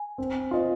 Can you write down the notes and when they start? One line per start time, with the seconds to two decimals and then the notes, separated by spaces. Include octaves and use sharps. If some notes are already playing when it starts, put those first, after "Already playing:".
Already playing: G#5
0.18 C4
0.51 F4 C5 D#5